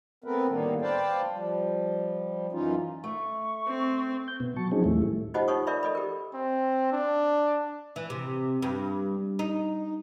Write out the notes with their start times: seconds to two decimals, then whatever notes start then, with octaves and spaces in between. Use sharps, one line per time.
0.24 A3 B3 C4 A#4 B4
0.49 A2 D3 D#3 G3 A#3 B3
0.82 B4 C5 D5 F5 G5 A5
1.31 F3 G3
2.52 F#2 E3 C#4 D#4 F4
3.04 A3 C#6
3.67 C4
4.28 G6
4.40 B2 B3
4.56 F#3 A5 C#6
4.71 F3 F#3 C4 C#4 D#4 G#4
4.84 D#2 A2 G3 A3 E4
5.34 D#4 F4 G4 C5 D#5 F#5
5.48 D#4 F4 C#5 F#5 C#6 D#6
5.67 A#4 D5 E5 B5
5.83 A4 D5 D#5 B5
5.95 G4 A#4
6.34 C4
6.92 D4
7.96 E3
8.10 C3
8.62 G2
9.39 D#4